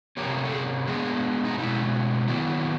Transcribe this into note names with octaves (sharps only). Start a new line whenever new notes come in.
C3 F3 A#3 C#4 G4
A4
G#4
F3 G#3 B3 D4 G#4
D#4
B2 G#3 C#4 E4
D#3 F#3 B3 E4